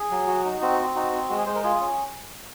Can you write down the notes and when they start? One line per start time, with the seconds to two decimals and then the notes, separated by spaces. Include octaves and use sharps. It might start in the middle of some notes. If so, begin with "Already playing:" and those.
Already playing: G#4
0.11 F#3
0.27 F#4
0.45 D#4
0.61 C4 F#4
0.79 C4
0.96 D#4 F#4
1.13 C4
1.29 G#3 F#4
1.38 G#4
1.46 G#3 C5
1.55 A#4
1.63 F4 G#4
1.80 C#4